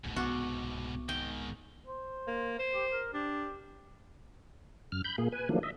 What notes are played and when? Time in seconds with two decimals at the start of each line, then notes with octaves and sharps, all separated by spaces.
0.04 E2 G#2 B2 A3
0.16 C2 B3 F#4 C#6 D6
1.09 G#2 D#3 G5
1.87 C5
2.27 A#3
2.59 C5
2.74 G4
2.92 A#4
3.14 D4 G4
4.92 F#2 F6
5.04 B5 G6
5.18 A#2 A#3 G#4
5.32 B4 G#5
5.49 D#3 F3 F#3 A3 A#3 D4
5.63 D#5 E5